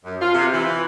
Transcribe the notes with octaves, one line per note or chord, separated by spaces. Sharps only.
F#2
F4
C3
E3